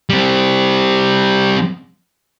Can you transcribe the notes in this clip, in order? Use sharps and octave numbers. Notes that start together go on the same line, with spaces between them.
G3 C4